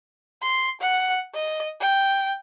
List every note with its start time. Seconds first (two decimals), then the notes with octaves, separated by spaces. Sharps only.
0.42 C6
0.81 F#5
1.34 D#5
1.81 G5